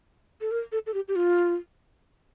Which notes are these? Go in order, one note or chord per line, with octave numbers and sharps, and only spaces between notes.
A4
A#4
A4
A4
G4
G4
F4